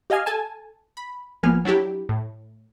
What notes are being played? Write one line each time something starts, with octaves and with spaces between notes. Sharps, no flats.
G4 D#5 F5 G#5 F6
A4 G#5 A5
B5
G#1 F3 A#3 B3 G#5 F6
F#3 D4 E4 G4
A2